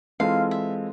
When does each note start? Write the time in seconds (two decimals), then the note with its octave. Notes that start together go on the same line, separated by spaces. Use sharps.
0.20 E3 G#3 C4 F4 A4 F5
0.51 E5